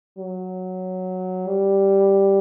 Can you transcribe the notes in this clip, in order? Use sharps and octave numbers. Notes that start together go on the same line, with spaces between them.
F#3
G3